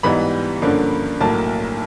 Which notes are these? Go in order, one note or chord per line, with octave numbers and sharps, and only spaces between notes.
G#2 E3 G3 B3 D#4 B5
G2 D3 F3 A#3 C#4
B1 A2 F#3 A#3 A5